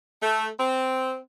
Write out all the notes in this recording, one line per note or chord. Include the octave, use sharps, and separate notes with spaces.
A3
C4